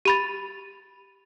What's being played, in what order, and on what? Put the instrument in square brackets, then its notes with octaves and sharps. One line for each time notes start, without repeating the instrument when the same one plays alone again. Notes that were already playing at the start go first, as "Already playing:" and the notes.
[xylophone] G4 B5 A6